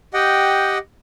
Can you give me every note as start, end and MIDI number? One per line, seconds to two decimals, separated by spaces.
0.14 0.78 67
0.14 0.78 75
0.14 0.78 78
0.14 0.78 79